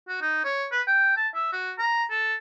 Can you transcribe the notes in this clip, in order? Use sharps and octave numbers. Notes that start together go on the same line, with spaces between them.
F#4
D#4
C#5
B4
G5
A5
E5
F#4
A#5
A4